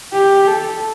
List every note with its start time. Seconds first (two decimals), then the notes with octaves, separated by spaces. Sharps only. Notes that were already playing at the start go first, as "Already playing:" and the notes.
0.13 G4
0.48 A4